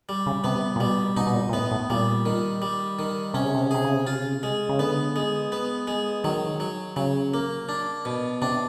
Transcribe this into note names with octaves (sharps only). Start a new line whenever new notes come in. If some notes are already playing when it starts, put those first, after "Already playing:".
G3
C#3
C3 B3
A#2
B2 G3
B2 D#4
B2
A#2
A#2
A2 B3
A2
A#2 G3
D#3
G3
D#3
C3 C#4
C#3
C3
C#3
C3 G#4
C#3
C3
C#3 F4
C3
C#3
C3
G#3
C#3
D3 B3
G#3
B3
G#3
D#3 F#3
F#3
C#3 F#3
A#3
D4
B2
C3 D4